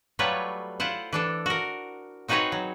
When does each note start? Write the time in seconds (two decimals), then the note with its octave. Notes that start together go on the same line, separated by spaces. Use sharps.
0.19 F#3 G3 A3 F4 B4 C#5
0.80 E4 F4 C5 F#5
1.13 E3 D4 A4
1.46 F#4 A#4
2.28 C4 D#4 F#4 G#4 B4 C#5
2.52 F#3